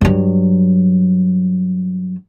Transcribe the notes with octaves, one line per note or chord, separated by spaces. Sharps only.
G2 F#3